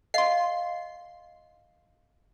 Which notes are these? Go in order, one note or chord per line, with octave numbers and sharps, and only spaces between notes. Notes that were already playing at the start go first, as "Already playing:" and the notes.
D#5 F5 C6 C7